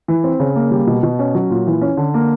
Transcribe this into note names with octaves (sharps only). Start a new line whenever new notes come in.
E3
C4
C#3
A#3
G3
B2
B2
C#4
F#3
A#2
E3
C#4
D3
A#3